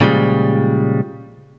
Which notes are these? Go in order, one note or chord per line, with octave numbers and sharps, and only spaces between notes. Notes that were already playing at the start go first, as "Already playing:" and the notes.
A#2 C#3 F3 G3 G#3